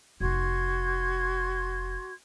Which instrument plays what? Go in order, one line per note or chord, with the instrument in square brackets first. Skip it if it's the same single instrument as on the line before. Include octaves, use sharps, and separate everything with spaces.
[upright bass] F1 D#4 [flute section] F#4 C6 G#6